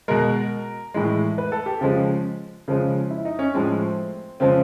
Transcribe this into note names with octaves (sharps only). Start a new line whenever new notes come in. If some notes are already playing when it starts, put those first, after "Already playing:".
B2 G#3 A#4
A2 E3 G#3
B4
A4
G4
C#3 F3 G#3
C#3 F3 G#3
E4
D#4
C#4
A2 F3 G#3 C4
C#3 F3 G#3 C4